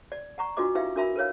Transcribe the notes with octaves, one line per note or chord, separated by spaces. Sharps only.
D5
F#5 A#5 C#6
D4 F4 F#4 B4 D#5 D6
D#4 E4 G4 B4 E5 F5
D4 F#4 A#4 E5 B5
A#4 B4 C#5 F5